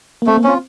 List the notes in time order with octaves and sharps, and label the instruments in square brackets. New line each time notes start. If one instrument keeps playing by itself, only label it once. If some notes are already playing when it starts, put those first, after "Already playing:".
[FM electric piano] A#3
[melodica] A3 [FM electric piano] C4
[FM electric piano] A#3
[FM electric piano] C4 [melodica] C#4 F4